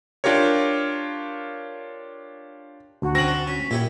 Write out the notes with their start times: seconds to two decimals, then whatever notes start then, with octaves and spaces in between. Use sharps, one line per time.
0.24 D4 F4 G4 A#4 C#5
3.02 D2 F#4
3.15 C4 C#4 A#6 F#7
3.28 D4
3.47 C#4 B6
3.71 A#2 E4 G4 C#5